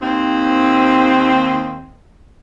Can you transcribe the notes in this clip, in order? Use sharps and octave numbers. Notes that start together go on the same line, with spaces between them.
D#2 C4